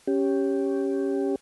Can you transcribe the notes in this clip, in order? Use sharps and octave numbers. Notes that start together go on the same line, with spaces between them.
C#4 G4